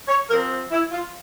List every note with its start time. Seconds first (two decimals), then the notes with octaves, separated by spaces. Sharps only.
0.08 C#5
0.29 F3 C4 A#4
0.71 E4
0.91 F4